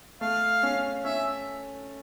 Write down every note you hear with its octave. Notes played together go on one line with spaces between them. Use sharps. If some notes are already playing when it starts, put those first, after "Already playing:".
A3 F5
C#4
C#4 E5